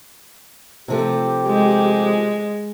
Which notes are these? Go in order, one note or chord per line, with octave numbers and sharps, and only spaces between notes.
C3 F3 A3 G4
G#3